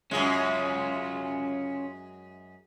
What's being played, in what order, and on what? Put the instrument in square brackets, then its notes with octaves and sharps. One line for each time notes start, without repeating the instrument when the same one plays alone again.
[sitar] F#2 G#3 [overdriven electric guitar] C#4 F4